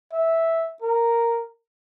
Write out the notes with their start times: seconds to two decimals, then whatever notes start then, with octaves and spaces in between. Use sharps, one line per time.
0.13 E5
0.82 A#4